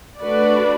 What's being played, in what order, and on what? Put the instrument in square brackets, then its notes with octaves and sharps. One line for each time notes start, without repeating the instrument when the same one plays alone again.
[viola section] A3 D4 F#4 B4 D5